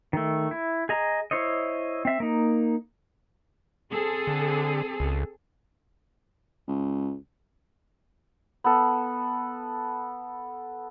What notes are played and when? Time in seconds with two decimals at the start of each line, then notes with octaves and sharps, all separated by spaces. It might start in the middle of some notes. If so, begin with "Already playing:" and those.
0.13 D#3 A3
0.51 E4
0.89 G#4 D#5 A#5
1.31 E4 C5 C#5 D#5
2.05 C4 E5
2.20 A#3 D#4
3.91 C4 G#4 A4
4.27 D3
5.00 C#2
6.68 C#2
8.64 B3 A4